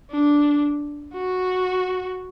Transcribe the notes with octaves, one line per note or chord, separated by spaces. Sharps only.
D4
F#4